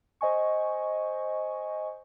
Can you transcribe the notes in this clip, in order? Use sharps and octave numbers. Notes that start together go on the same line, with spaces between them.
C5 D#5 G#5 C#6